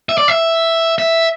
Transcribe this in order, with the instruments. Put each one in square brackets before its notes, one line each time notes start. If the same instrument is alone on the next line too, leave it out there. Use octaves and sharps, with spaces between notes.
[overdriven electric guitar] E5
D5
E5
E5